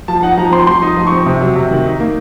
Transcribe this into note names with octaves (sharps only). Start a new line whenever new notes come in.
F3 A5
D#4 F#5
F3 A#5
C4 C6
F3 C6
D#4
D#6
F3
C#6
C4
C3
F#3
C3
D#3
D#4
A#3